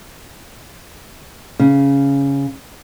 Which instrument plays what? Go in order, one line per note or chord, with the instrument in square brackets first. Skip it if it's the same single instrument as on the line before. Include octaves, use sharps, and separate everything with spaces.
[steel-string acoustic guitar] C#3